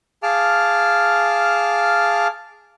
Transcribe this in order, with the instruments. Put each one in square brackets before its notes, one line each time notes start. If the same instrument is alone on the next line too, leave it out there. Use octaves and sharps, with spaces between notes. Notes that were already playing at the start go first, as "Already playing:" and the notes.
[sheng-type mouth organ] G#4 F5 A5 D6 F6